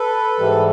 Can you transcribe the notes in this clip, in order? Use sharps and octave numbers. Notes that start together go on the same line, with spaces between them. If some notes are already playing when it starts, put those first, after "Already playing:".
Already playing: A4 B4
G#2 E3 G3